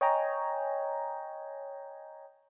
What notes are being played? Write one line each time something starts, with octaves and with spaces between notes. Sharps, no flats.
C#5 D#5 G5 G#5 A#5